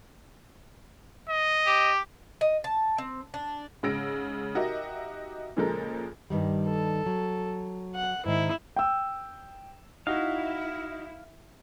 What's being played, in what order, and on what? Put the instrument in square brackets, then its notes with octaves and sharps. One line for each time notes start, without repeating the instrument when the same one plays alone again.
[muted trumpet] D#5
[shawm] G4
[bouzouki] D#5
A5
C4
D4
[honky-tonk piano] G#2 C#3 E6 A#6 D7
D#4 F#4 G4 A#4 D#5 E5
A#2 C#3 F3 G#3 A4 A#4
[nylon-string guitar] G2 D#3 G3
[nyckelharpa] A4
[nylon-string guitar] F#3
[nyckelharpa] F#5
[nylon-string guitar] G#2 D#3 [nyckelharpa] E4
[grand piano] G5 E6
[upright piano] D#4 F#4 [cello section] E4 [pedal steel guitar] F5